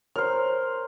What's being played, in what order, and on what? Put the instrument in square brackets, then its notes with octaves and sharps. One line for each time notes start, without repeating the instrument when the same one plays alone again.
[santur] A#4 C5 [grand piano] C#5 F6